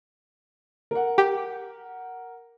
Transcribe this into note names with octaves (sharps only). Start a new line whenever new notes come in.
A#4 F#5
G4